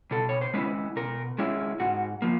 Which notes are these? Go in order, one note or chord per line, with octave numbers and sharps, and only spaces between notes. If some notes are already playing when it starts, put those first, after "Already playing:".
B2 A4
C#5
C5
G#3 C#4 E4 B4
B2 A#4
G#3 C#4 E4
G#2 F#4
F3 A#3